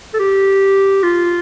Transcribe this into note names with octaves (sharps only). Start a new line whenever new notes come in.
A4
G4
F4